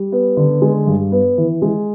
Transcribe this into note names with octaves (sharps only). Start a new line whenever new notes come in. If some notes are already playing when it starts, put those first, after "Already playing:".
Already playing: G3
B3
D3
G#3
G2
B3
E3
G#3